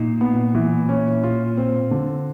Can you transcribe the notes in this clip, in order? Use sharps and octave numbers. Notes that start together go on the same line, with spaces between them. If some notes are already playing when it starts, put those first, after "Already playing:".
Already playing: A#2 D#4
B3
E3
C#4
F4
C4
D3